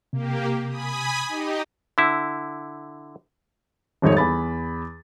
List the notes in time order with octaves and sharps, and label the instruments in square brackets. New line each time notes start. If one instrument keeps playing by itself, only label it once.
[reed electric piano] C3 [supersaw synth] A#3 G4
[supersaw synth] G#5 B5 D#6
D#4 G4 D#5
[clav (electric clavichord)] D3 E4
[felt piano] D#1 G#1 F2 D#4 C#5
E2 B5 A6